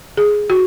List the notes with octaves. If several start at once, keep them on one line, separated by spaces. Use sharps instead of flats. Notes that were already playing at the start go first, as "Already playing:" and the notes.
G#4
F#4